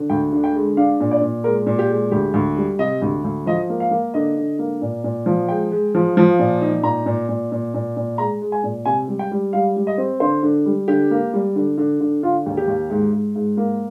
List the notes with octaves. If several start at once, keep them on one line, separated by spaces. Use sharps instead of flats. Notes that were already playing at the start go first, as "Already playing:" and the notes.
Already playing: D3
D2 G5
D3
G5
G#3
D4 F5
A#2
D5
A#2
G#3 A#4
A#2
G4
G#3
D2 G4
D2
G3
C3 D#5
D2
D2
F3 D#5
A#3
F5
A#3
D3 D#5
D3
A#3
A#2
A#2
F3
G#3 G5
G#3
F3
F3
A#2
D#4
A#2 A#5
A#2
A#2
A#2
A#2
A#2
G#3 A#5
G#3
G#5
A#2
C3 G#5
G3
G5
G3
G3 F5
G3
D#5
C4
D3 C5
D3
G3
D3 G4
A#3
G3
D3
D3
D3
D3 F4
D#2
G4
D#2
G#2
G#2
G#2
A#3